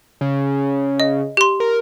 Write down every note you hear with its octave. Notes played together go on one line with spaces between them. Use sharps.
C#3
D#5
G4 C6
A#4